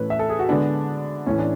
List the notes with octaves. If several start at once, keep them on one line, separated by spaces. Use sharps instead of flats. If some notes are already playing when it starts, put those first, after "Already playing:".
Already playing: A2 E3 A3 C#4 B4
E5
A4
G#4
F#4
D3 G#3 B3 D4
A2 E3 A3 C#4
D4